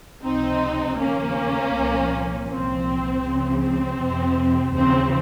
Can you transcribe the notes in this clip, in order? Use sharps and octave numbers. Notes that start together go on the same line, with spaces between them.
C#2 C3 F3 C4 D#4
D#2 C#3 F3 A#3 C#4
C2 A#2 F3
C2 A#2 F3 C4
C#2 C#3 F3
C4
F2 C3 F3
D#2 C#3 F3 C4